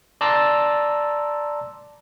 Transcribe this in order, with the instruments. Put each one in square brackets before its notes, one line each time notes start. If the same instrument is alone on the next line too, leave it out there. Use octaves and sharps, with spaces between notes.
[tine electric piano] D5 A5 A#5 C6 D6 E6